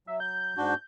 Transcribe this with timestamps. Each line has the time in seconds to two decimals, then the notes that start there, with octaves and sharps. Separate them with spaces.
0.07 F#3 E5
0.20 G6
0.57 G#2 D4 F#4